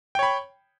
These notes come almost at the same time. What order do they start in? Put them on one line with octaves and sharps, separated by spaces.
G5 C#5 B5